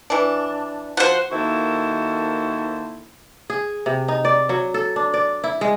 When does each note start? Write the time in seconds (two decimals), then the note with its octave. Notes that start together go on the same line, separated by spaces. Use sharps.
0.10 E3 D4
0.97 F3 F#4 C5 F#5
1.31 D#3 A#3 E4 F#4 A4 C5
3.50 G#4
3.86 C3
4.08 D#4
4.25 D5
4.49 F#3
4.74 A4
4.96 D4
5.14 D5
5.44 E4
5.61 G#3